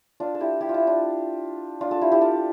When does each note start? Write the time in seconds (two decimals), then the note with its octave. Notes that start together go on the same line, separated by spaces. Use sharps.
0.20 D4 F4
0.35 A4
0.40 E4 G4
0.61 E4 G4
0.69 F4
0.74 E4
0.87 D4 F4
1.81 D4 F4
1.91 F4 A4
2.01 E4 G4
2.11 E4 G4
2.21 F4 A4